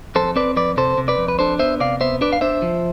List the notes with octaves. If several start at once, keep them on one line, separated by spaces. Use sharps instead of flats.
F2 A4 C5
C4 B4 D5
F2 B4 D5
C3 A4 C5
C3
B4 D5
F2
B4
D4 A4 C5
B3 C5 E5
C3 D5 F5
B3 C5 E5
D4 B4 D5
F5
D4 C5 E5
F3